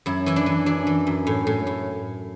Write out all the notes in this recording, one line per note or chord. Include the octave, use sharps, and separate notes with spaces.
F#2 E4
E3 E4
D4
E3
F#2 D4
E3
F#2
A2
A2
A2